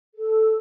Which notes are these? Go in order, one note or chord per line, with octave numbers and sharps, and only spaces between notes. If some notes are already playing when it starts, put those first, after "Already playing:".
A4